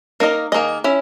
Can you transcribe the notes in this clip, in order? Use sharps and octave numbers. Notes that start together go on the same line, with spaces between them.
A#3 D#4 A#4 D#5
D#3 A#3 D#4 G#4 D#5
C#4 E4